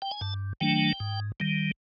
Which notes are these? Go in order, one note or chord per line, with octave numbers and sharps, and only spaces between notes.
G5
G#5
G2 A5
D#3 F#3 A3 D4 G5
G#2
D#3 G3